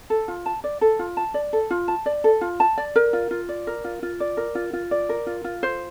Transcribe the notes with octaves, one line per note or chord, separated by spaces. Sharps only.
A4
F4
A5
D5
A4
F4
A5
D5
A4
F4
A5
D5
A4
F4
A5
D5
A#4
F4
F4
D5
A#4
F4
F4
D5
A#4
F4
F4
D5
A#4
F4
F4
C5